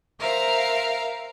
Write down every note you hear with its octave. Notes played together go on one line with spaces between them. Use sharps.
A#4 C5 E5 F5 A#5